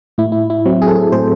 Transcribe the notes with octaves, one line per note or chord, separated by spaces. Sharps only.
A2 E4
E4
E4
F#3 C4
G#4
A4
G#4
A2 C5